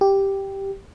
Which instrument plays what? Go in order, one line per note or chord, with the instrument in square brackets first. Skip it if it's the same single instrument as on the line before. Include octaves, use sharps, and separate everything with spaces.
[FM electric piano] G4